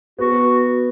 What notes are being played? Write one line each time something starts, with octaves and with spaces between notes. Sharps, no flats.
B3 F#4